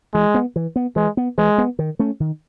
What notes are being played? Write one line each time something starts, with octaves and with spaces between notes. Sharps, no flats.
E3 G#3
B3
E3
B3
E3 G#3
B3
E3 G#3
B3
D#3
A3 C#4
D#3